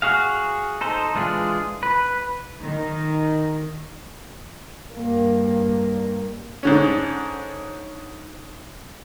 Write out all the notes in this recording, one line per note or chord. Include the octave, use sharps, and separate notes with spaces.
F#4 G#4 F5
D#4 A4 C5
E3 G#3 D4 F4 G#4
B4
D#3
G2 A#3
G#2 D3 C#4